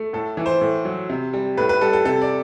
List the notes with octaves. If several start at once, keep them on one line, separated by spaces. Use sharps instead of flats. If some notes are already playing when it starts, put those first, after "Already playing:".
Already playing: A3
A2 A4
E3
C5
A2
F#3
C3
G3
A2 B4
B4
G3 A4
A4
C3 A4
D5